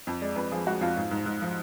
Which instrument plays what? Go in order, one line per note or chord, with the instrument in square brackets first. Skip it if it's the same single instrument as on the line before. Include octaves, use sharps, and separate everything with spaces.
[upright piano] F2
G#3 D5
F2 B4
F3 G#4
G#3 F#4
F2 F4
G#2 F4
G#2
G#2
F3